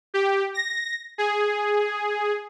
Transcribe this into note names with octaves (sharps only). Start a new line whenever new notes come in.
G4
A#6
G#4